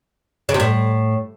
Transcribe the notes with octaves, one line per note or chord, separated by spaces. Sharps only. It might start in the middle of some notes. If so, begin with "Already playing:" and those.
C#3
C3
A2